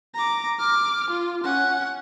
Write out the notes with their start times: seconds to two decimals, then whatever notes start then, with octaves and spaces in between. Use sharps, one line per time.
0.15 A#5 D6
0.59 D6 F6
1.11 F4
1.44 C#4 F#5